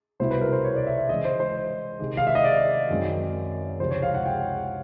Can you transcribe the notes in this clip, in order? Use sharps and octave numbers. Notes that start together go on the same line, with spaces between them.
C2 B2 G3 B3 E4 C5
B4
A#4
C5
C#5
D5
E5
E5
C#3 E3 G#3 D#5
C5
C5
C3 D#3 G#3
F5
E5
D#5
D5
F#2 D#3 G#3 C4
C#2 C3 F3 C5
C#5
F5
F#5
G5